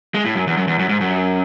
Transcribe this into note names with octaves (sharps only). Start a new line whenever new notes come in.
G#3
A2
F#2
E2
F#2
E2
F#2
G#2
F#2